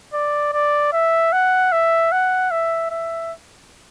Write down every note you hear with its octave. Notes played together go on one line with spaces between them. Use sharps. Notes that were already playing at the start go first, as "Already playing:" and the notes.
D5
D5
E5
F#5
E5
F#5
E5
E5